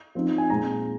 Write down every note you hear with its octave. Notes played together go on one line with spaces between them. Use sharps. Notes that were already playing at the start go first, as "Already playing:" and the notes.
F3 C4 D#4
G#5
A#2 G#3 C4 A#5